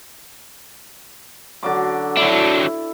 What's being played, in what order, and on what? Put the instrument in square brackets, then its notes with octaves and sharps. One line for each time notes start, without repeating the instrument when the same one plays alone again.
[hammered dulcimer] D3 F#3 D6
[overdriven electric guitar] F#3 D4 [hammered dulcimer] E4